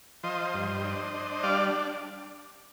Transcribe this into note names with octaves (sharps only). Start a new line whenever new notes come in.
F3 C5 D#5
G2
D4
D4
G3 D5 F5